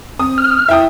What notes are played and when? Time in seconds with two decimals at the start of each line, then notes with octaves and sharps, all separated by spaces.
0.19 C4 D#6
0.38 F6
0.69 E4 E5 G5 D#6